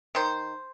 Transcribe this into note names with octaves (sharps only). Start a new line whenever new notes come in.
D#3 C5